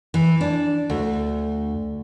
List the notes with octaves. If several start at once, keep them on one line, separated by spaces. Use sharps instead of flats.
E3
D4
D2